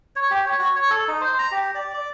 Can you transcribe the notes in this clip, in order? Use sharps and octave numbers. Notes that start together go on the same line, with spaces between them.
C#5
G4
C#5
F#4
C#5
A4
D#4
C5
A#5
G4
D5
D5